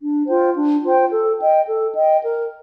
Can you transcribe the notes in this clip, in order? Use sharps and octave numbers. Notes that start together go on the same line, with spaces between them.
D4
F4 C5 G5
D4
F4 C5 G5
A4
D#5 G5
A4
D#5 G5
A#4